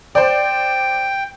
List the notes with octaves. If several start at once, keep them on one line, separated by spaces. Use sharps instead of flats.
C5 D5 G5